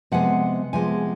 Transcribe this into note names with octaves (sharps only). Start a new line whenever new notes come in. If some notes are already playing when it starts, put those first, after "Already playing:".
C3 F3 G#3 B3 F#5
C3 F3 G#3 B3 G#5